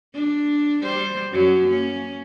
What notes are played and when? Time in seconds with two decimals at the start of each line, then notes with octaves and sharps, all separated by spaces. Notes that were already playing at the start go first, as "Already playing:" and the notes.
0.14 D4
0.82 G3 C5
1.32 F#2 F#3 C#4
1.67 A#3 C#4